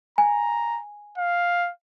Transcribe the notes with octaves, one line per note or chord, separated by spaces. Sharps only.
G#5 A#5
F5